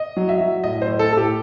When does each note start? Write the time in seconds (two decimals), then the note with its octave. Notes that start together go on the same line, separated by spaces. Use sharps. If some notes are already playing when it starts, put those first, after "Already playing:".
Already playing: D#5
0.17 F#3
0.29 E5
0.41 F#3
0.64 A2 D#5
0.82 C5
0.87 A2
0.99 A4
1.12 A2 A4
1.17 G4